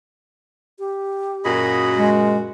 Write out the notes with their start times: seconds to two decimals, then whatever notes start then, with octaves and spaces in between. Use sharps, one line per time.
0.79 G4
1.44 F#2 A#2 F#4 G#4 D#5 B5
1.97 G#3